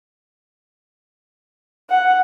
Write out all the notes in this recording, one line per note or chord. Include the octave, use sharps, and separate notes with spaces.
F#5